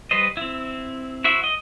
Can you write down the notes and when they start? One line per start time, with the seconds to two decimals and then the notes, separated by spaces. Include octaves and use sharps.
0.11 G3 B4 C5 D#5
0.37 C4 E4
1.24 E4 F#4 C5 E5
1.44 D#5